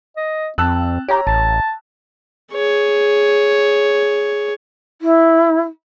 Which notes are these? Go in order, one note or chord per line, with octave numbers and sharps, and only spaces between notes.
D#5
F2 C4 A5 E6 F#6
G4 C#5 A#5
A1 A5
G#4 C#5
E4